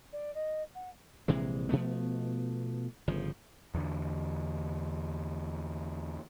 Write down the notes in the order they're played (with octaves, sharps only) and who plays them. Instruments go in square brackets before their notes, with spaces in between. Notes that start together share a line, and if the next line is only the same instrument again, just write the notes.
[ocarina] D5
D#5
F#5
[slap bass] A#1 C3 E3 G#3
B2 F3 A3 B3
G1 C#3 F3
[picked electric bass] E2 D3